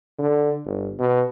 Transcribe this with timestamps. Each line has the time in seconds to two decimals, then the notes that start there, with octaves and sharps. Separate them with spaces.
0.19 D3
0.65 G1
1.00 B2